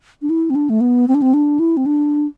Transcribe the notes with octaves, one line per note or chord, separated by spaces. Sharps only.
D4
E4
C4
D4
A3
B3
C4
D4
C4
D4
E4
C4
D4